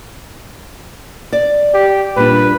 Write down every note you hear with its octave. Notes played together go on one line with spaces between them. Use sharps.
D5
G4
A#2 G3 D4 B4